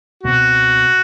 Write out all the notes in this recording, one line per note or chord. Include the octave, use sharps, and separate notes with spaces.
C#2 B2 G#3 C4 F#4